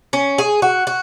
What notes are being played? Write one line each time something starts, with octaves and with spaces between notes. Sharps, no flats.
C#4
G#4
F#4
F#4